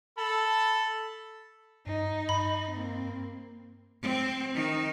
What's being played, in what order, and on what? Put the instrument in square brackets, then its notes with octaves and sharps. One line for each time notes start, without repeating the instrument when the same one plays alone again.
[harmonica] A4 A5 B5
[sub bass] G2 [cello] D#4
[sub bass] G2 [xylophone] B5
[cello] A#3 C4
C4
D#3 D#4